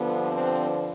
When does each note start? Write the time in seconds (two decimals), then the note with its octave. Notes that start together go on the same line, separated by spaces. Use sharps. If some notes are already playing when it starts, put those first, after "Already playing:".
Already playing: G2 D3 F3 B3
0.30 C4